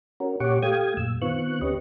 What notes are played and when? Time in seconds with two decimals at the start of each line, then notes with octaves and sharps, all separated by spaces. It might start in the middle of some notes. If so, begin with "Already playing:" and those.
0.20 C#4 F#4 A#4
0.40 A#2 G4 C#5 F#5 C#6 D6
0.63 A3 G4 F5 G5 D#6 G#6
0.97 F#2 A#2 E6
1.22 D#3 B3 C4 F4 C#6 F#6
1.61 D2 C#4 G4 B4 D#5 C#6